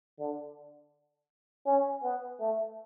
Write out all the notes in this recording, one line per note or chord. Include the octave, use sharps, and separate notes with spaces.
D3
C#4
B3
A3